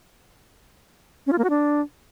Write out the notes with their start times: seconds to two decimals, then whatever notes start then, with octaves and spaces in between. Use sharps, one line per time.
1.27 C#4
1.32 F4
1.38 A#3
1.44 F#4
1.50 D4